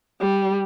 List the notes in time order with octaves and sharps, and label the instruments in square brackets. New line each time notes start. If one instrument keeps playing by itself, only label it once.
[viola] G3